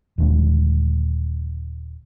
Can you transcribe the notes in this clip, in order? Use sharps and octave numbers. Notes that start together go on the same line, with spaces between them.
D#1 D#2 D3 G#3